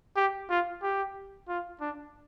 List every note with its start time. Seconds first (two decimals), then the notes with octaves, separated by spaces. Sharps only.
0.16 G4
0.50 F4
0.83 G4
1.49 F4
1.81 D4